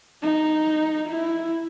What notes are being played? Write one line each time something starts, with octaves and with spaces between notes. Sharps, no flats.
D#4
E4